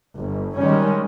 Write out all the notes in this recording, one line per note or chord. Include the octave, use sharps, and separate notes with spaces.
G1
D#3 G3 G#3 C#4